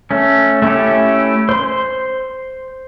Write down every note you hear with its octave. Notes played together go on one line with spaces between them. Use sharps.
A3 C#4
A3 C#4 E4 G4
C5 C6